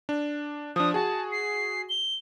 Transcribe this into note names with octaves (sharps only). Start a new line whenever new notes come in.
D4
F3 D4 D#6
F#4 G#4 A5
C7
G7